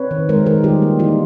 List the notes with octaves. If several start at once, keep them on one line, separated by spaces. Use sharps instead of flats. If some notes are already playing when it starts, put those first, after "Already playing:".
Already playing: C4 B4 C#5
D#3
G#3 A#4 C5
D#3 G#4 A#4
G3 F4 G4
A#3
E3 D#4 F4